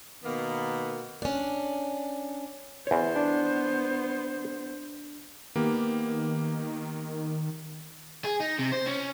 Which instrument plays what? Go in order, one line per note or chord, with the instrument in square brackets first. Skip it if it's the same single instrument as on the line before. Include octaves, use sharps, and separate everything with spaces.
[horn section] B2 D#3 A#3 B3
[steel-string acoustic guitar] C#4 D4
[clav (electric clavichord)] E2 C#5 [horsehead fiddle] B3 C5
[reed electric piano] D4
[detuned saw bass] D#3 [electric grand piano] A#3 B3 G4
[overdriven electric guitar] G#4
D#4
C3
C5
C#4